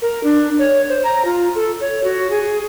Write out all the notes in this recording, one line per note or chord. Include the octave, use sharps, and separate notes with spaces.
A#4
D4
C#5
C5
A#5
F4
A4
C#5
F#4
G#4